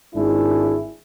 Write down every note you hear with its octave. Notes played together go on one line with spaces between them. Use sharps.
G#1 G#2 D4 E4 G#4